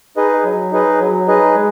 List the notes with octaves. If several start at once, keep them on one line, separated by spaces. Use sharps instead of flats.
D#4 G#4 B4 D#5
F#3
D#4 G#4 B4 D#5
F#3
D#4 G#4 B4 D#5
G#3